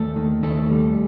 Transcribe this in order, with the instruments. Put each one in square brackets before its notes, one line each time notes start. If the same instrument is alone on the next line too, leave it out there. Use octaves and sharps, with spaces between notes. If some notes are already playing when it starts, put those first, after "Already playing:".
Already playing: [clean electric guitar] D#2 A3 A4
D#3
D#2 A3 A4
G3